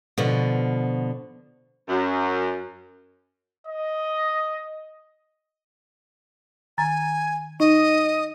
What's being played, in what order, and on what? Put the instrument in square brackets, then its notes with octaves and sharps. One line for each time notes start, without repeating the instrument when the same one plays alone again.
[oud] B2 D3 F3
[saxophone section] F#2
[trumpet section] D#5
[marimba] D#3 A#5 A6 [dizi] G#5
[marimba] D#4 [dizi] D#5